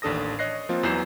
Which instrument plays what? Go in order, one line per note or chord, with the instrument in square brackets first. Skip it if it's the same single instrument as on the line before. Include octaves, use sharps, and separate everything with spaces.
[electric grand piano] A1 D#2 D4 A4 D#6 A#6
C#5 D#5 F#6 A#6 C7
F3 A#3 C4 F4
E2 E3 F#3 G6 C7 E7